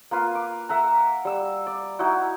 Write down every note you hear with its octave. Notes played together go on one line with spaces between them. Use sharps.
A#3 F4 B4 F5
D6
A#4 E5 F#5 A#5
G3 E6
D5
D#4 E4 F#4